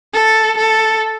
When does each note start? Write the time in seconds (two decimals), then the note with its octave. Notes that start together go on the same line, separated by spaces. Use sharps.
0.14 A4
0.57 A4